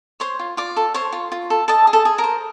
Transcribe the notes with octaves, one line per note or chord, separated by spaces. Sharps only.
C5 C#5 C6
F4
F4 D5 D6
A4
C5 C#5 C6
F4
F4
A4
A4 D#5 A5
G#4
A4 A5
G#4
A#4 A#5
C5